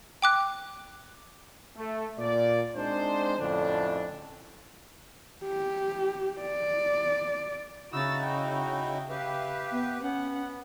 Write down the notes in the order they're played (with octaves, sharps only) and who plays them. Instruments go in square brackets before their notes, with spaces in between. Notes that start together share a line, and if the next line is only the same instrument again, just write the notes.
[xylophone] G5 D6 F#6
[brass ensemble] A3
A#2 D5
G#3 C4 D4 D#4 C5
F2 A2 D3 C#4 D4
[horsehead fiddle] G4
D5
[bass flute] C#3 [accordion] D#4 E4 F#4 [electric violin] E6 A6
[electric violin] G5
[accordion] G4 B4 [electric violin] E5 F5
[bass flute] B3
[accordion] B3 [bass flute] C#4 [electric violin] F#5